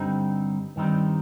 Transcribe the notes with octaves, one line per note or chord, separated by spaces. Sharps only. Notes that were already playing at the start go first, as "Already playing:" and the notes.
Already playing: G2 D3 G3 C4 D#4
G2 D#3 G3 C4 D#4